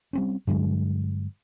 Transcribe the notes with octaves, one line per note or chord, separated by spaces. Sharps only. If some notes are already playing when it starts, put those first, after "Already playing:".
G3 C4 C#4
G2 D3 F#3 G#3